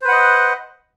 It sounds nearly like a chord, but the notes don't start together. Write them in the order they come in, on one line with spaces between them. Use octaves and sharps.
C5 B4 F#5 D#5